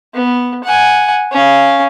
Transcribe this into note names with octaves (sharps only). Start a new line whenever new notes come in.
B3
F#5 G#5
C#4 F5